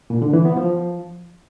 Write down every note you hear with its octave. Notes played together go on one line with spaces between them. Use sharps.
A#2
D3
E3
B3
F3